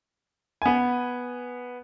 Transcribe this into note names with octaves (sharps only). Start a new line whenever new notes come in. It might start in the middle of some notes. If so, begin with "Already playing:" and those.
B3 G#5